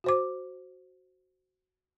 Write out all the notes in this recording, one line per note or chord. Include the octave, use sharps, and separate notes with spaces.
F#4 C5 D6